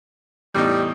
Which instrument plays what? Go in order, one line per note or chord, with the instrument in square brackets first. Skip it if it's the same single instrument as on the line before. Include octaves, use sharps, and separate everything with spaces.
[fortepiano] E2 A2 D#4 [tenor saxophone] G3